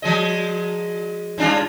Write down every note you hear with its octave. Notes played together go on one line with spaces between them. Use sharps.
F3 G#3 D#5
G2 D4 F4